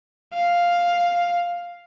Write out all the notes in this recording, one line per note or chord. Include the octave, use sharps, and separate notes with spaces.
F5